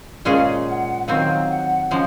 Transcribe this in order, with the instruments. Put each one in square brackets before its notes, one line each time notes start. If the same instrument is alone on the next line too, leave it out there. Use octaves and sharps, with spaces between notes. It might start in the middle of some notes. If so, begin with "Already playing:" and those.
[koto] A#2 G#3 C#4 G#4 [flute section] F5
[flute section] F#5
[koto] D#3 F#3 C4 [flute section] F5
[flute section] F#5
[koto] C#3 F3 G#3 [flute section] F#5